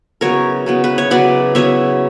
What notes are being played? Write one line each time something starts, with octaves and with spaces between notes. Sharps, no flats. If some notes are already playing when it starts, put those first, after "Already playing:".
C#3 F#3 B3 E4 A#4 C#5
C#3 F#3 B3 E4
B4
C#5
C#3 F#3 B3 E4 B4 D5
C#3 F#3 B3 E4 C#5 E5